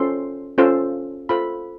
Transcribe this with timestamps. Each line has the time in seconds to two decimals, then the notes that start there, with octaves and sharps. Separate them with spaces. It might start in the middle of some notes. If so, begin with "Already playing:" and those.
Already playing: C#4 F4 A4 C5 C6
0.58 C#4 F4 A4 C5
1.29 F4 A4 C5 B5